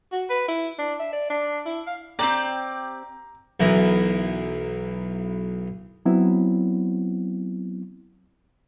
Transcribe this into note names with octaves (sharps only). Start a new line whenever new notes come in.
F#4
B4
E4
D4
E5
D5
D4
E4
F5
C4 D#4 G4 D5 G5 A#5
B1 E3 E4 A#4
F#3 B3 C4 E4